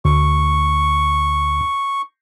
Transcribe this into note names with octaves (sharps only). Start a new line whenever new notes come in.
D2 C#6